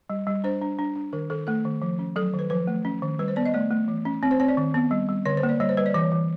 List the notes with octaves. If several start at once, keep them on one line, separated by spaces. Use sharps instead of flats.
G3
G3
D4 C5
D4
D4
D4
D#3 A#4
D#3 A4
A3 A4
D#3
F3
C#4
F#3 A4
D#3
B4
F3 B4
A3
C#4
D#3
G3 B4
C5
B3 D5
D#5
A3 D5
A3
E3
C#4
C4 C#5
C5
C4 C#5
D5
D#3
B3
G3
G3
D3 C#5
C5
A#3
D5
G3 C#5
C5
G3 B4
D5
E3 C#5
E3